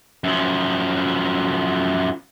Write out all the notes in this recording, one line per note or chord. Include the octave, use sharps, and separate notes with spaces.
F#2 F3